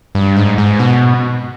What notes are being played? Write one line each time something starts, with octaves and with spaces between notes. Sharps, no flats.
G2
G#2
G#2
B2